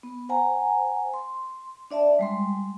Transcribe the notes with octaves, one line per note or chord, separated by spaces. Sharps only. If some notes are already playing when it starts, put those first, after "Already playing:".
B3
C5 F#5 G#5 A#5
C6
D4 D5 E5 A5
G3 G#3 C6